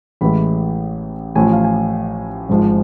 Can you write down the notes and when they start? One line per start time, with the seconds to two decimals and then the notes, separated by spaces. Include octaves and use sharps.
0.21 A1 A2 E3 G#3 B5
1.35 A1 A2 F3 G#5
1.53 F5
1.64 G#5
2.49 G#1 G#2 F3 G#3